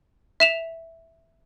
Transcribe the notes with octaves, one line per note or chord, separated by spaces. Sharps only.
E5 E7 F7